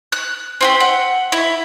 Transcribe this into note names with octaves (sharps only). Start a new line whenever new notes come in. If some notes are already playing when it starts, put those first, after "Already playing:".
F#6
C4 F#4 G4
F#5
E4